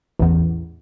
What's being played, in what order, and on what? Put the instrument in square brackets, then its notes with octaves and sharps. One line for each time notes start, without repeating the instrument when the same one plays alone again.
[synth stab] A1 E2